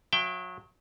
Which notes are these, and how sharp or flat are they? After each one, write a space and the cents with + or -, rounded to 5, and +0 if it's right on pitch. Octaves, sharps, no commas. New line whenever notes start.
F#3 -30 E5 +35 G5 +0